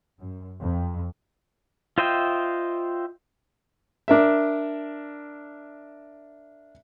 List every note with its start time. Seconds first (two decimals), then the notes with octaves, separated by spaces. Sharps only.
0.19 F#2
0.61 F2
1.98 F4 C5 D#5 E5 G5
4.08 D4 A#4 E5